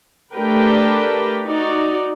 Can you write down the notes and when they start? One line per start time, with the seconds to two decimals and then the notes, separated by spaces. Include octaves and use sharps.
0.34 A3 D4 G4 A#4 B4 G5
1.46 D#4 F#4 D5